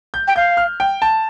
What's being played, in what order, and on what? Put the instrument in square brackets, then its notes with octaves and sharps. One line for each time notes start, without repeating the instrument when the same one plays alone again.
[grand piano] G6
[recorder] G5
[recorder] F5 [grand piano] G6
[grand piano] F6
G5
A5